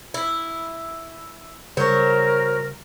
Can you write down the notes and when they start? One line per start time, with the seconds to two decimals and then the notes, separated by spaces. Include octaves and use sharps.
0.14 E4
1.77 C#3 F#3 G3 A#4 C5 C#5